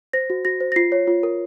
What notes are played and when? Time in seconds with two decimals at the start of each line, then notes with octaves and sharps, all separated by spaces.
0.13 C5 A#6
0.30 F#4
0.45 F#4 A#6
0.60 C5
0.72 A#6
0.76 F4 C7
0.92 C#5
1.07 F4
1.23 A#4